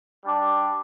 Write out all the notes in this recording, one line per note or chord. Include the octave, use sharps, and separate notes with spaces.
G3 D4